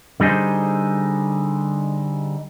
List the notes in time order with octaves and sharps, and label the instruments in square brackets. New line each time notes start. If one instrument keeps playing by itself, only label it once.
[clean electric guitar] D3 G3 D#4 G#4 C5